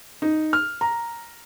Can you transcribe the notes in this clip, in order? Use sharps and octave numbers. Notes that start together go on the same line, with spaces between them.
D#4
F6
A#5